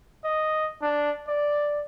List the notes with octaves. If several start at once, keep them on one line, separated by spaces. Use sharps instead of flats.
D#5
D4
D5